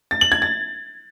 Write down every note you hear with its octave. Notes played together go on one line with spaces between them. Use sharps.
A6
F#7
G#6
A6